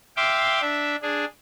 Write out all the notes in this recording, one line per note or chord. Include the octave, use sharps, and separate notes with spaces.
E5 F5 G5 C6 D6
D4 E5
D4 G#4